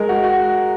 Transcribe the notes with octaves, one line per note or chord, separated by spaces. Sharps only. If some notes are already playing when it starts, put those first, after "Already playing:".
Already playing: G#3 A#4
F#4
F#4